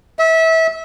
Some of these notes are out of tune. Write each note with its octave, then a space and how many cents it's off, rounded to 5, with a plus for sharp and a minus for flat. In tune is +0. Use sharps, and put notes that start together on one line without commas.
E5 -25